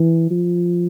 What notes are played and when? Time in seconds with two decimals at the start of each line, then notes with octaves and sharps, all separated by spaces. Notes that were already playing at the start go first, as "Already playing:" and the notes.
Already playing: E3
0.30 F3